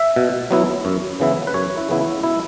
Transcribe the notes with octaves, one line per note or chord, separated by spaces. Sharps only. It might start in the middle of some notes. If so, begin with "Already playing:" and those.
Already playing: E5
B2
F#3 B3 E4
F#2
C#3 E3 B3 E4
B4
F#2 C#5
E4
C#3 E3 B3 E4
E4
B2 E4